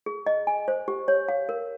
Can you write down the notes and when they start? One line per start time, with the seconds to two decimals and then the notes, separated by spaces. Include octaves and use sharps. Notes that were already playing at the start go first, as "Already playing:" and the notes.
0.06 G#4
0.26 D#5
0.47 G#5
0.68 C5
0.88 G4
1.08 C#5
1.28 F5
1.49 A#4